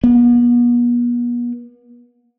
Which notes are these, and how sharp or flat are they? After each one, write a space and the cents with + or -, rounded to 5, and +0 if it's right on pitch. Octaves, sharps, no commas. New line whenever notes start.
B3 -40